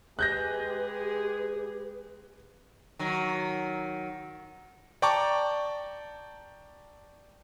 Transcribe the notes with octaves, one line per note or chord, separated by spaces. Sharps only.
G#3 G4 G#4 B4 F#6 G6 A#6
D#3 F#3
D5 G5 A5 A#5 C#6 D6